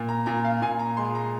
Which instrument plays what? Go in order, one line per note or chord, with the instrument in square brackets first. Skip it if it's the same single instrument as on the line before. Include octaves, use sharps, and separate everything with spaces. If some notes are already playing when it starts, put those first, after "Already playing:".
Already playing: [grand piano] A#2
A#5
A#2 A#5
F5
A#2 G#5
A#5
G#3 C6
A#5